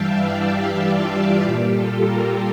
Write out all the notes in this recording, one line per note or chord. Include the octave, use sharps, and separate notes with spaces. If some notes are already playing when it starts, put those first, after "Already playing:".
Already playing: G2 E3 G3 E5 F5 G5 A5
D5 F5
G4
F4
A#2 G3 G4
F4 A4
G4 A#4